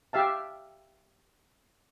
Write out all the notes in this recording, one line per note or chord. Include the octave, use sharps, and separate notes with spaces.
G4 E5 F5 A5